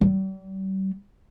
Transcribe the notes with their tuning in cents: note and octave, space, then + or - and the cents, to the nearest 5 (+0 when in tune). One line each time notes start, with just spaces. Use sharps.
G3 -40